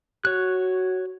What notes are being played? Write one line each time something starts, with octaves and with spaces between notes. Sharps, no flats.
F#4 C#5 F#6